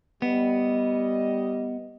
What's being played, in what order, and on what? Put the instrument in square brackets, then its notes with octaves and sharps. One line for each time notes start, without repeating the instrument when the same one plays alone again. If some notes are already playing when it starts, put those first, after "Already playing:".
[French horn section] G3 D#5 [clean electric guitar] B3